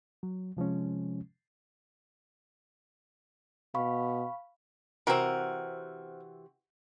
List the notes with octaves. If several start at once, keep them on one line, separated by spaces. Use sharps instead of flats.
F#3
C3 F3 G#3 C#4
B2 F5 B5 C#6
C3 E3 C4 F#4 A#4